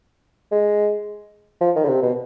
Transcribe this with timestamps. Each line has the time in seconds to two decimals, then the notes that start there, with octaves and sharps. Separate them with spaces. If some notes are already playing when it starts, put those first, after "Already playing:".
0.52 G#3
1.61 F3
1.76 D#3
1.85 D3
1.89 C3
2.02 B2